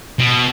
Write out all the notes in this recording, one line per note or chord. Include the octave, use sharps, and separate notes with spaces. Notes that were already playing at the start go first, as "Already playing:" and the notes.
B2